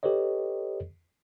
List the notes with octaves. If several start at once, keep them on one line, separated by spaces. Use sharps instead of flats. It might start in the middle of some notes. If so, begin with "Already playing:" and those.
G4 A4 B4 C#5 D#5